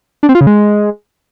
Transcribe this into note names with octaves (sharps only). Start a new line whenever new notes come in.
D4
C4
F4
C#3
G#3